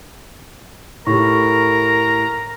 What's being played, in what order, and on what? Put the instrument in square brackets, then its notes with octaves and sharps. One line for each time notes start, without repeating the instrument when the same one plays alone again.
[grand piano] A2 [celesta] G4 A4 C#6 [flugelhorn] A#4 [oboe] A#5